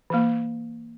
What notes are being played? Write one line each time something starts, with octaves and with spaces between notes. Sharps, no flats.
E3 A#3